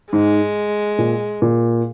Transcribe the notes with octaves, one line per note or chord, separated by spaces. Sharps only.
G#2 G#3
A#2
A#2